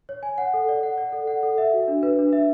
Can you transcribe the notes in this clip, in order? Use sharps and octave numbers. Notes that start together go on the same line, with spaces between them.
C#5
G#5
F#5
A4
D5
F#5
D5
A4
F#5
A4
E5
F#4
D4
B4
D4
E5